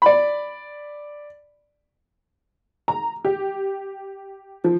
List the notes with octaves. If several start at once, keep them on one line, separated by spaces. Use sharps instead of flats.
D5 B5
A#5
G4
F3